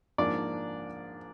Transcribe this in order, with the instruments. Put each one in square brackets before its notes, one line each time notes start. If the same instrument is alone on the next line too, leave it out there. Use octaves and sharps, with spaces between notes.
[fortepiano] G#2 F3 A#3 D4 D5